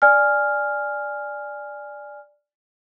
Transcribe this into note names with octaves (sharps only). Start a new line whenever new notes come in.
D5 G#5 F6